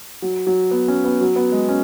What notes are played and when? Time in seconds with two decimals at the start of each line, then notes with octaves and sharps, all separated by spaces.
0.22 F#3
0.47 F#3
0.71 B3
0.88 C#4
1.04 B3
1.21 F#3
1.36 B3
1.52 G#3
1.69 C#4